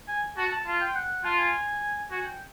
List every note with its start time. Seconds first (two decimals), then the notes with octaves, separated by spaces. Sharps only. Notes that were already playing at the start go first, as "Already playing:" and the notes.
0.08 G#5
0.37 F#4 A5
0.51 A5
0.66 F4
0.81 G5
0.95 F#5
1.24 F4 A5
1.39 G#5
2.11 F#4 G#5
2.26 G5